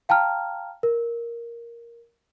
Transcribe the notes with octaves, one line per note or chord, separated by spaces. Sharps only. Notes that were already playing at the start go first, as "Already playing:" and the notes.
F5 G5 A5 A#5 F6
A#4